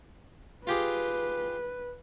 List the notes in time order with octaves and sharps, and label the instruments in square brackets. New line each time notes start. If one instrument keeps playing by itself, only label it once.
[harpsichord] F4 G4 G#4 [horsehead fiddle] B4